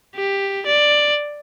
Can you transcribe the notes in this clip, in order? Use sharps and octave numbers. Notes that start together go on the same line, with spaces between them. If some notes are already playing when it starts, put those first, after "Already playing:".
G4
D5